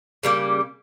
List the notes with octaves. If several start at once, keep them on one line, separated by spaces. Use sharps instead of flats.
C#3 G3 A#3